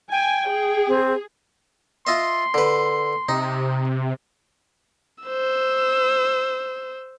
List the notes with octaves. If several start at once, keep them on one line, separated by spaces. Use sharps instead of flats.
G5 G#5
G#4
C4
F4 D#5 E5 C6
D3 B4
C3 D#4
C5 E6